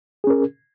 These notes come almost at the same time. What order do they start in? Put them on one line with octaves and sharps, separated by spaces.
G#4 C#4 A#4